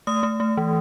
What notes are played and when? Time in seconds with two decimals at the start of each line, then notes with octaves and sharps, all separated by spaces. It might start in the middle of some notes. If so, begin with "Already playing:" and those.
0.07 A3 D#6
0.23 A3
0.40 A3
0.57 E3